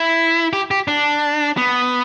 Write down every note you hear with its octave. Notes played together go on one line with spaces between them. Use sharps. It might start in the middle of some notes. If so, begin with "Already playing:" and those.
Already playing: E4
G4
G4
D4
B3